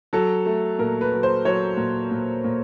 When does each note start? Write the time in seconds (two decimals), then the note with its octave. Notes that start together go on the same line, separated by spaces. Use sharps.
0.13 F#3 A4
0.46 A3
0.79 A#2 A#4
1.01 B4
1.12 F#3
1.23 C5
1.45 F#3 C#5
1.77 A#2
2.11 A#2
2.44 A#2